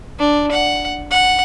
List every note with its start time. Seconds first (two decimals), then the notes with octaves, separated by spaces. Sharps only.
0.19 D4
0.52 F#5
1.11 F#5